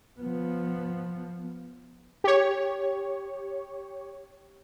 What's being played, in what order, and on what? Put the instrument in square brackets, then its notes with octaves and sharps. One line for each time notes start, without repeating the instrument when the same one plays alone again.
[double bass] F3 B3
[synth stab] G4 C#5